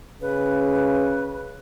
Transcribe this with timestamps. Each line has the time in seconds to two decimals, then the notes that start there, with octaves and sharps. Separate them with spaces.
0.21 C#3 B4